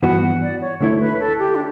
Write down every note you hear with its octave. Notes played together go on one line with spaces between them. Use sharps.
G2 E3 B3 F#4 B4 F#5
D5
C#5
D2 D3 A3 E4 A4 C#5
B4
A4
G4
D4